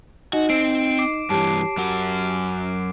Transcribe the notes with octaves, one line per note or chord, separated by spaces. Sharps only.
D#4 F#4 D#5
C4 C7 D7
D6 C7
G2 E3 G4 C#5 A5
F#2 F#4